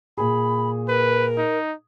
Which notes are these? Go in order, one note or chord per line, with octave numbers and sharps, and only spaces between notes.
A#2 G#4 B5
A#4 B4
D#4